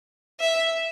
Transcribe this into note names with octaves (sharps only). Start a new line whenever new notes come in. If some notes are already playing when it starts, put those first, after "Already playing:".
E5